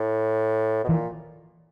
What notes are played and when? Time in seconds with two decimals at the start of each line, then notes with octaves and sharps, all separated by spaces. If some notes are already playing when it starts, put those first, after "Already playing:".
Already playing: A2
0.84 B2
0.89 A#2 E3